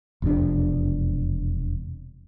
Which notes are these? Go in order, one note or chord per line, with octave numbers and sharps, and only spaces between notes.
E1 F2 C3 D4